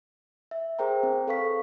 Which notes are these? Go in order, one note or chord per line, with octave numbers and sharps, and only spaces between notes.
E5
G#4 A#4 C5 G5 A#5
C4
A4 B4 F5 C#6 B6